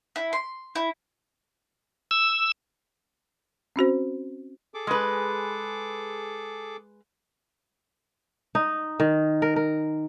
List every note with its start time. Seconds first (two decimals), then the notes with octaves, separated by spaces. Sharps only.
0.16 E4
0.33 C6
0.75 E4
2.11 E6
3.76 C4 C#4 F#4 C5
4.74 G#4 A4 D6
4.87 G#3 B4
8.55 D#4
9.00 D#3
9.42 A#4
9.56 A#4